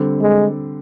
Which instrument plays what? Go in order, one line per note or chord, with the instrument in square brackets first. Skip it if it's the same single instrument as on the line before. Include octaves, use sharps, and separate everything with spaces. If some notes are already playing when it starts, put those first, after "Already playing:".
Already playing: [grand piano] D3 G3 C4
[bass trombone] G#3